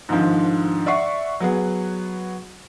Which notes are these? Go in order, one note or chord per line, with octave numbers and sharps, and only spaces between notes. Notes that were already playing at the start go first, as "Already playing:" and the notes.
G#2 D3 D#3 F3
D5 E5 F#5 C#6 C7
F#3 B3 G#4 F#5